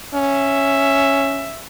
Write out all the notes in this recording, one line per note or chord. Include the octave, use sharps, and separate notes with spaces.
C#4 E5